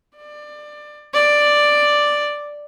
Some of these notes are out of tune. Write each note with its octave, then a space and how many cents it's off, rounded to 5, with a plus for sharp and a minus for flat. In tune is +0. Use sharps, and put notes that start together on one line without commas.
D5 +20
D5 +5